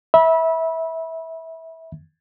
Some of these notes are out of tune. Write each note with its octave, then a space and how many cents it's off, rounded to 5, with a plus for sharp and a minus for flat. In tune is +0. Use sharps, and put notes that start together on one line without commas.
E5 -20 B5 -25